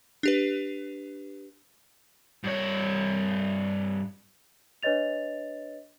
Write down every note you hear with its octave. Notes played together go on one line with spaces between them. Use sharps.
D4 G4 B4
G2 C#5
D4 B4 C#5 D#5 A6 F7